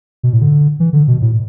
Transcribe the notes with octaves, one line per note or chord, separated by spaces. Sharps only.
B2
A2
D3
E3
D3
B2
A2